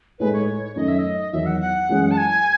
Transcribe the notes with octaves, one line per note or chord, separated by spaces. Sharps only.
A2 G#3 D#4 B4
C#5
F#2 D#3 A3 D#4 D#5
E5
D#5
E2 D#3 F#3 E5
F#5
F#5
F#2 E3 G#3 C#4 G#4
A5
G#5